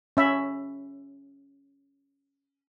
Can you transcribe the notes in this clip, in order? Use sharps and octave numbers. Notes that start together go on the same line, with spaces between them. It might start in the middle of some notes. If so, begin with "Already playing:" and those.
C#4 E5 B5